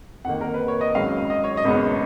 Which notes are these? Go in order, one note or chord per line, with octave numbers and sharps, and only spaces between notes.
F2 D#3 A#3 F#5
A#4
B4
C#5
D#5
G#1 G#2 F#3 C#4 F5
D#5
C#5
D#5
G#1 F#2 C#3 G#3 B3